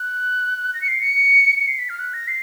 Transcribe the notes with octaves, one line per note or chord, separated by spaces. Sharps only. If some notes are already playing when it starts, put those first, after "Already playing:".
Already playing: F#6
A#6
C#7
C7
C#7
C#7
C7
B6
F6
F#6
A#6
C7